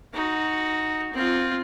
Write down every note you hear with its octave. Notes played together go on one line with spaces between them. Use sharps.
D#4 F#4
C4 F4